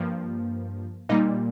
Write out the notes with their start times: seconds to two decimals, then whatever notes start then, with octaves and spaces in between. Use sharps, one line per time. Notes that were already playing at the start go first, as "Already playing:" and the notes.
Already playing: G2 F3 A#3
1.09 A#2 G3 A#3 D#4 D#5